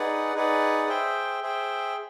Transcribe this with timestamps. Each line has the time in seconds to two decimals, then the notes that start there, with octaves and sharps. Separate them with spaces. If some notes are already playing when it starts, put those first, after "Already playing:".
Already playing: D#4 G#4 B4 D5 F#5
0.34 D#4 G#4 B4 D5 F#5
0.88 G#4 C5 E5 G5
1.43 G#4 C5 E5 G5